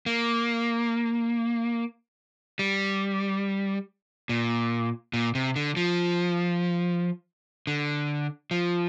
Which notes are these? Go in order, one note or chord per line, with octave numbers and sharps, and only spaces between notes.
A#3
G3
A#2
A#2
C3
D3
F3
D3
F3